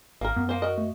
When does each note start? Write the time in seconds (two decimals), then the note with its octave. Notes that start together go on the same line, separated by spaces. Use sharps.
0.21 G#1 A#3 A#4
0.36 F#2 B3
0.49 A#3 C5
0.62 F#4 A#4 D#5
0.78 A3